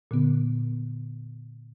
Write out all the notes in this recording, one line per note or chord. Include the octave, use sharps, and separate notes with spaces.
A#2 D3 B3